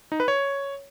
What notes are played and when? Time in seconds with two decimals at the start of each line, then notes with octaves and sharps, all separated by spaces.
0.12 D#4
0.20 B4
0.28 C#5